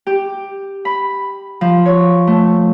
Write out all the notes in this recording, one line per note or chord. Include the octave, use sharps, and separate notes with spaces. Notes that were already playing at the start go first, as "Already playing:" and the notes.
G4
B5
F3
C#5
A3